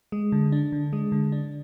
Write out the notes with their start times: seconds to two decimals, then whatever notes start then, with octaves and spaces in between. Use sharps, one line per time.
0.12 G#3
0.32 D3
0.52 D4
0.72 D3
0.93 G#3
1.12 D3
1.32 D4